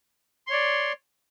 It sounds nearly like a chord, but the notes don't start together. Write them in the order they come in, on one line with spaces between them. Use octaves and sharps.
C6 C#5 D5